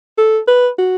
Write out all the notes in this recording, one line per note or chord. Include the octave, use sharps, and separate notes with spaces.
A4
B4
F#4